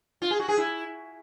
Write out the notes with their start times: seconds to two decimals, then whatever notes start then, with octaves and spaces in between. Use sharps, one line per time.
0.22 F4
0.31 G#4
0.40 F#4
0.48 G#4
0.57 E4